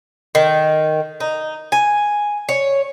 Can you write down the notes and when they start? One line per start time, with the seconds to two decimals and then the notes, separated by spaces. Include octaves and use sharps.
0.35 D#3
1.20 D#4
1.72 G#5
2.49 C#5